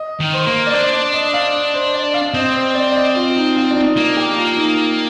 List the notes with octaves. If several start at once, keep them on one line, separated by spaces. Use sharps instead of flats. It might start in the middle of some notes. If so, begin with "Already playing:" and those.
Already playing: D#5
D#3
C5
A#3
D5
D4 C5
D5
D#5
F5
D#5
C5
D5
F5
C4 D#5
C5
D5
D5
D#5
F4
D#4
F4
D4
D#4
A#3 D#4
G4
F4
D#4